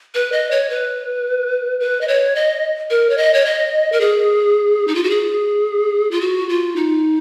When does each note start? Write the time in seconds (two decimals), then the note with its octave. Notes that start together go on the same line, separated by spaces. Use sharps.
0.15 B4
0.32 D#5
0.51 C#5
0.70 B4
1.80 B4
2.01 D#5
2.08 C#5
2.35 D#5
2.90 A#4
3.10 C#5
3.18 D#5
3.34 C#5
3.45 D#5
3.92 A#4
4.01 G#4
4.88 D#4
4.95 F4
5.04 F#4
5.10 G#4
6.11 F4
6.21 F#4
6.49 F4
6.76 D#4